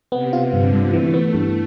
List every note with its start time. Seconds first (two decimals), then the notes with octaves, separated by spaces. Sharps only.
0.12 C3 B3
0.33 F4
0.53 G2 D3
0.73 G2
0.93 E3 A3
1.14 B3
1.34 G2